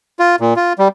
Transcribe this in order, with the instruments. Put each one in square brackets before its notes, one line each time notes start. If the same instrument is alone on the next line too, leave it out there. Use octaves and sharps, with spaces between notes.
[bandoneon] F4
A#2
F4
G3